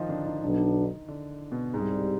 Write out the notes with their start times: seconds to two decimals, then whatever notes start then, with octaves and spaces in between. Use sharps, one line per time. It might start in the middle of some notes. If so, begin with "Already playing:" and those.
Already playing: D#3 F3 D#4 F4
0.09 D3 D4
0.26 D#3 D#4
0.41 B1 B2 D#3 B3 D4 D#4
1.08 D3 D4
1.52 B2 B3
1.73 C2 G#2 C3 G3 G#3